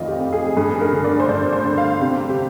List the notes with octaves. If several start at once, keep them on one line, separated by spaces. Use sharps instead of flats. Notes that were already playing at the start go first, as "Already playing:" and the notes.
Already playing: F2 D#3 F4 D5 D#5
G4
F2
G#4
G2 G#4
A#4
D3
D5
C5
G2 D5
C5
D3
F5
C3 G4
G4